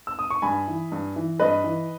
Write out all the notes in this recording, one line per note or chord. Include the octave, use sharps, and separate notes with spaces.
E6
D#6
C#6
G2 G#5 B5
E3
G2
E3
G2 B4 D#5
E3